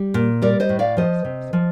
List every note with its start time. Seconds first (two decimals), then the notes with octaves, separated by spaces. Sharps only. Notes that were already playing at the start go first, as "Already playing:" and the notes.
Already playing: G3
0.14 A#2
0.42 G3 A#4 D5
0.60 C5 D#5
0.69 A2
0.79 D5 F5
0.97 F3 C5 D#5
1.25 C3
1.53 F3